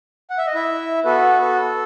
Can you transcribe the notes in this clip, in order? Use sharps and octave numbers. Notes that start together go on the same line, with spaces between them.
F#5
E5
D#5
E4 E5
B3 F#4 A4 B4
A4